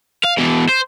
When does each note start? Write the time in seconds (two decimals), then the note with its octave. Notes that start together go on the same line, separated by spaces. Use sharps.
0.25 F5
0.39 B2 E3
0.69 C5